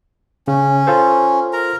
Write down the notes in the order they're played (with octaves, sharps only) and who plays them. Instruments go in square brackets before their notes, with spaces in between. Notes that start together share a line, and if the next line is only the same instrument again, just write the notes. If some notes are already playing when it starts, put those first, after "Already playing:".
[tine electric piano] C#3 [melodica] C#4
[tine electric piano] F4 A4 C5
[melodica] A#4 A#5